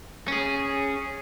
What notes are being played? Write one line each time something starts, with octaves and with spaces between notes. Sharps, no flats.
C#4 G#4